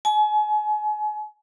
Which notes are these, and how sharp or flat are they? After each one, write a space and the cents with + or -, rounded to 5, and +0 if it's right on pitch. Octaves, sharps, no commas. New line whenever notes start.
G#5 +35